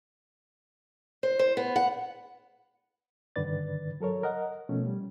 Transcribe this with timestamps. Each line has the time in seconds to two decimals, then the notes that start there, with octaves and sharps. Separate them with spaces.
1.23 C5
1.39 C5
1.57 B3
1.76 F#5
3.36 G2 D3 D#3 B4 D5 A6
4.00 F#3 A4 A#4 C#5
4.23 A#4 D#5 F#5
4.69 B2 F3 A3 C#4
4.86 G3